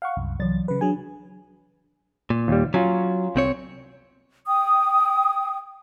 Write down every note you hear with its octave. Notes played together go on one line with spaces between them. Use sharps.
F5 F#5 C#6
C2 F#2
C2 E3 F#3 A6
C#3 B4
F#3 D4 G#4 G#5
A#2
D#2 G3
F#3 C#4 F4
C2 C4 C#5
G5 D#6